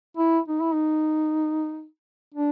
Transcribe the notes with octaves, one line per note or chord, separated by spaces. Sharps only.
E4
D#4
E4
D#4
D4